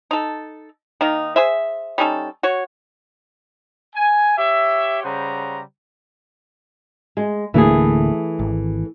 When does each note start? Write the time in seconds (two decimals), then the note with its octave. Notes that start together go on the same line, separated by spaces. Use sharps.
0.11 D#4 A4
1.01 D#3 A#3 D#4
1.36 G#4 C5 E5
1.98 G3 C#4 D#4 A4
2.43 F#4 C#5
3.95 G#5
4.38 G4 C#5 E5
5.03 C#3 G3 C5 F#5 A#5
7.17 G#3
7.54 D1 D3 E3 A3 A#3 G#4
8.39 G#1